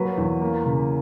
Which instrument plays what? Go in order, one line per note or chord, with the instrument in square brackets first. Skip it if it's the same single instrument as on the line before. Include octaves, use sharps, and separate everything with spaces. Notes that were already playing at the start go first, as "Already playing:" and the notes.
Already playing: [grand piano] F#3 A#3 B4
E2
A#3
C#3